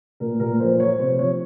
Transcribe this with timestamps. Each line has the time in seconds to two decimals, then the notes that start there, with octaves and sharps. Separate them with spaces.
0.20 A#2 A#4
0.40 A#2 A#4
0.60 F3 C5
0.80 F3 C#5
0.99 C3 C5
1.19 F3 C#5